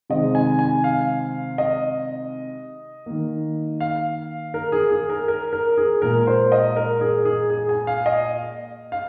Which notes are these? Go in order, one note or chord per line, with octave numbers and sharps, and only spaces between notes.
C3 D#3 G#3 D#5
G#5
G#5
F5
D#5
D#3 A#3
F5
A#4
G#4
G#4
A#4
A#4
A#4
G#4
A#2 G#3 A#4
C5
D#5
A#4
G#4
G#4
G#4
G#5
F5
D#5
F5